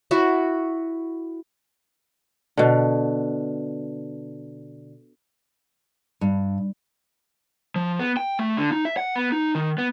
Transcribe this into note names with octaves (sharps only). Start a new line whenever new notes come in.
E4 F#4
B2 D3
G2
F3
B3
G5
A3
D3
D#4
E5
F#5
B3
D#4
D#3
B3